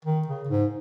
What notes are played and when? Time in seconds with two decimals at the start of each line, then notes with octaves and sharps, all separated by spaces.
0.05 D#3
0.27 C#3
0.49 G#2